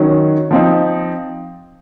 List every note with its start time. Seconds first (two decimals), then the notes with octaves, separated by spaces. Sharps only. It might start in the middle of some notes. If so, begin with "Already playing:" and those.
Already playing: D#3 F#3 C#4
0.51 F3 C4 D#4